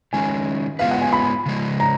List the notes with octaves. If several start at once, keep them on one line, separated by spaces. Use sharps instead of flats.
D#3 G#3 C#4 G#5
G#3 B3 F4 G#4 B4 F5
F#5
G#5
B5
C#3 F3 G#3
A#5